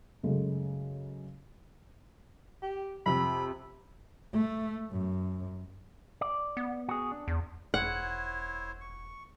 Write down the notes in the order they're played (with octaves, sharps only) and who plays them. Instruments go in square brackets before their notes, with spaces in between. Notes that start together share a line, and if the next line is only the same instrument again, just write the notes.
[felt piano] F#2 C#3 G#3 A3
[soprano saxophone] G4
[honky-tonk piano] F2 C3 [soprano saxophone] B5
[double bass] A3
F#2
[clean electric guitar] D5
[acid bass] B3
[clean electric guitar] F#4 G#4
D4
[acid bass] E2
[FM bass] E1 [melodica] E4 C5 C#5 [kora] F#5
[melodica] C#6